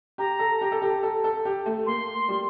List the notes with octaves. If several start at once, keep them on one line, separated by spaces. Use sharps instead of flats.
G4 A#5
A4
G4
A4
G4
A4
A4
G4
A3
A#3 C6
G3